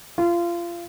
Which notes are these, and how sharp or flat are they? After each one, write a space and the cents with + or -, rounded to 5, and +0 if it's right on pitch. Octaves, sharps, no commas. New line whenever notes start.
F4 -25